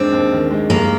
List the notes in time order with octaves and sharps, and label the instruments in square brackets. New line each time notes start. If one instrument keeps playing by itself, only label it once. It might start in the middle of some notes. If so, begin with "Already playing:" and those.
Already playing: [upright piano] D#2 D#3 G#3 D4 [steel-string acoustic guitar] C4
[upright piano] D#2
D#3
G#3
[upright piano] G2 [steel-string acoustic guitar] A#3